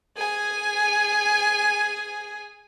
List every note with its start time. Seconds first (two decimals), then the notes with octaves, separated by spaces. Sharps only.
0.17 G#4 G#5